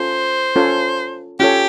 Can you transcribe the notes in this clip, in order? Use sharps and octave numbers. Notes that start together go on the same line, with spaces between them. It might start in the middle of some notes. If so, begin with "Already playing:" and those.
Already playing: C#4 F4 A4 C5
C#4 F4 A4 C#5
C#4 F4 G4 A4 C#5